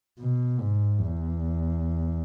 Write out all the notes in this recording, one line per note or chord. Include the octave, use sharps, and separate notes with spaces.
B2
G#2
E2